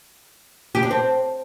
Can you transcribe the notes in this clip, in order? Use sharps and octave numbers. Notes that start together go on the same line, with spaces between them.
G4
D4
C4